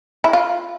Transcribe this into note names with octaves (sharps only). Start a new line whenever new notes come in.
E4
F4